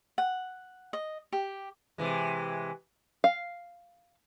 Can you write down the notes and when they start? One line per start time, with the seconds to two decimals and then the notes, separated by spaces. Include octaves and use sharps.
0.18 F#5
0.93 D#5
1.32 G4
1.98 C3 E3 G#3
3.24 F5